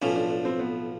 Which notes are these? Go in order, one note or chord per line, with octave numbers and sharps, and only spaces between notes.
B1 A2 F3 C#4
D4
D4
C4
B3